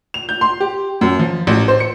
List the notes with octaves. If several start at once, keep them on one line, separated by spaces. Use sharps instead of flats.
F7
G6
C6
G4
F#2
F3
A1
C5
C#7